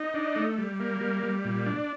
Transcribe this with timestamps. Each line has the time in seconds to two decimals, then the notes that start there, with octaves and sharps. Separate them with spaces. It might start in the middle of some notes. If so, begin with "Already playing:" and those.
Already playing: D#4
0.14 D4
0.36 A3
0.58 G3
0.80 A#3
1.01 G3
1.23 G3
1.45 A#2
1.66 D4